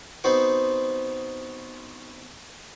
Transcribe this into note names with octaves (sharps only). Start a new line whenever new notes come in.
B3 C4 D#4 F#4 C5 F#5